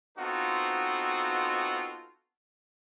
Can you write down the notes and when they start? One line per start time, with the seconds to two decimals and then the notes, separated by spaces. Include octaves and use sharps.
0.18 B3 C4 D#4 F4 F#4 A4